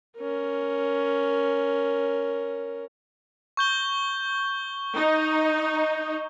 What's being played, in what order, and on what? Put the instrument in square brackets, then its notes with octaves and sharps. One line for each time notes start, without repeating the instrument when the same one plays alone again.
[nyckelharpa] C#4 A#4
[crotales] C#6 G6 G7
[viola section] D#4